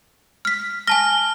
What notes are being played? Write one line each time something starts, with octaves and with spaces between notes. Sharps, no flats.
F6 B6
G#5 A5 F6 A#6